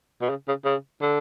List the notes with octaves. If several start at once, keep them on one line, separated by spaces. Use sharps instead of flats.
B2
C#3
C#3
C#3
D3